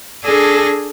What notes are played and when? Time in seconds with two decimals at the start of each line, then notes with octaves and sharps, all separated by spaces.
0.23 D4 G#4 A4 G#5 A#6